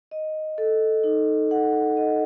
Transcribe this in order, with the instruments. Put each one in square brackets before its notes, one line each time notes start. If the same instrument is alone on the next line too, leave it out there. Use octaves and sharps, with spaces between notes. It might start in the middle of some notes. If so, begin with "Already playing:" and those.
[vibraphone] D#5
A4
D#4
F#5
D#5